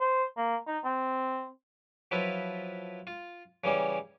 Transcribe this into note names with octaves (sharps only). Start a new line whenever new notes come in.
C5
A#3
D#4
C4
F3 F#3 E4 F4 B4
F4
C#3 E3 G3 C#4